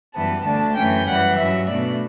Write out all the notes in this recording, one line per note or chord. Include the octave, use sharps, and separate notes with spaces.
F#2 E3 G3 B3 A5
D2 D3 A3 D4 A5
F#2 E3 A3 C#4 G5
F#2 E3 G3 F#5
G2 F#3 C#4 E5
B2 A3 D4 D5